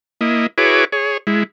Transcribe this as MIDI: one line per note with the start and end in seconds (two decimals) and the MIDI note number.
0.21 0.47 58
0.21 0.47 64
0.21 0.47 75
0.58 0.85 64
0.58 0.85 66
0.58 0.85 68
0.58 0.85 71
0.58 0.85 73
0.58 0.85 86
0.92 1.17 68
0.92 1.17 73
1.27 1.43 56
1.27 1.43 64